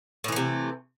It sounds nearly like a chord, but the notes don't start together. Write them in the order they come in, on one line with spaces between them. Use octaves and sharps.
A2 E3 A3 C3